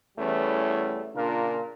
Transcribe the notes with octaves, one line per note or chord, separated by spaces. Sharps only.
E2 E3 G3 A3 C#4
A#2 C#3 D4 F4 A#4